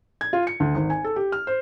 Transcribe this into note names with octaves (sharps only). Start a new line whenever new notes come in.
G#6
F4
C#7
D2
G#1
G#5
A4
G4
F6
C5